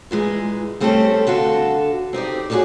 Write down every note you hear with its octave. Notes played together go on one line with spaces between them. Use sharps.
A#2 E3 G#3
G3 A3 C4 C#4 G4 A4
D3 F#4 A4 F5
C4 D#4 G4 D5
F#4 G#4 A4 B4 C#5 D5